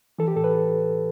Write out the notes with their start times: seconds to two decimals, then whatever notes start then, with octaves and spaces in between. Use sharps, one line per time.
0.19 E3 A4
0.28 G4
0.36 A2 A4
0.44 B4